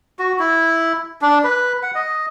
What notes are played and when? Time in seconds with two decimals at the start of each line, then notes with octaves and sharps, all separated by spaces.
0.19 F#4
0.39 E4
1.22 D4
1.44 B4
1.83 F#5
1.95 D#5